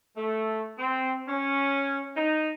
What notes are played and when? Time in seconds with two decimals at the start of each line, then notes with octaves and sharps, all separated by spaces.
0.17 A3
0.79 C4
1.27 C#4
2.17 D#4